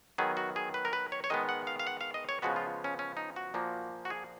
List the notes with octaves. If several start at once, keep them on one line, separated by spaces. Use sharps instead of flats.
D#3 F#3 B3 G#4
F#4
G#4
B4
A#4
B4
C#5
C#5
D#3 G#3 B3 D#5
F#5
F5
F5
F#5
F5
D#5
C#5
C#3 F3 G#3 B3 F#4
F4
C#4
C#4
D#4
F#4
A#2 F3 A#3
F#4
G#4